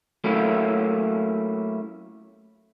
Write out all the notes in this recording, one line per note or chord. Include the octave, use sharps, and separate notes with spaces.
F#3 A3 A#3 C#4 E4